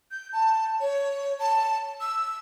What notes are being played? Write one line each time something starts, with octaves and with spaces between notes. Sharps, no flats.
G6
A5
C#5
A5
E6